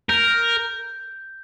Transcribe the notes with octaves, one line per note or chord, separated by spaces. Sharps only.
A#4 G6